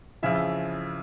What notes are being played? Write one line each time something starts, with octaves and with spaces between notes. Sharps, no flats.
F2 C#3 E3 E5